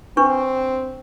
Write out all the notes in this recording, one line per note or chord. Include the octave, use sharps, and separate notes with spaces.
C4 D4 B4 C#6